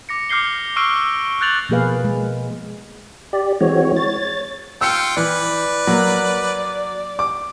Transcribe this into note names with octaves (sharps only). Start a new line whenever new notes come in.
D6 A#6 C#7
D6 F6 G6 C7 G7
C#6 E6 F6 C7 D7
F#6 G6 A6 F7 F#7
B2 F3 A#3 G#4 B4 F5
G#3
G4 D5
E3 G#3 C4 F#4 C#5
C#5 A6
F4 G5 E6 C#7
E3 B4 D5
F#3 A#3
D6